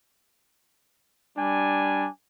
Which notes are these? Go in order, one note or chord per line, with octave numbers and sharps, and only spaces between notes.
G3 D4 G#5